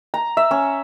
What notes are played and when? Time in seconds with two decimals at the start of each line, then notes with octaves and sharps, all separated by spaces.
0.14 A#5
0.37 E5
0.51 C#4